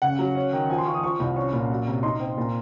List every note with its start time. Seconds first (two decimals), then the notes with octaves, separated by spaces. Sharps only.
0.02 C#3 F#5
0.19 F#3
0.35 C#4
0.53 D#3
0.70 F3 G#5
0.78 C6
0.85 F3 C#6
0.94 D#6
1.03 F3 C#6
1.20 C2
1.36 C#4 C#6
1.53 A#2
1.70 F#3
1.87 C3
2.03 D#4 C6
2.20 C4
2.37 A#2